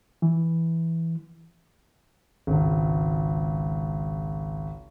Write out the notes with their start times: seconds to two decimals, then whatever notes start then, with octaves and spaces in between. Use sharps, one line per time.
0.22 E3
2.47 G#1 C#2